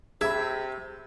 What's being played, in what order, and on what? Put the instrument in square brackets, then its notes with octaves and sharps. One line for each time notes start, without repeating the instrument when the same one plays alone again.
[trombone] C3 [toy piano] G#4 [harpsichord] E5 [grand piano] B5 E6 G#6